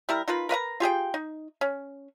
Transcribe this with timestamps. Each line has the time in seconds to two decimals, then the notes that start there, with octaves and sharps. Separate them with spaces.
0.09 G3 E4 A#4
0.28 D#4 F4 A#4 B4
0.49 A#4 B4 F5 A#5
0.80 F4 G4 G#4 G5
1.14 D#4
1.61 C#4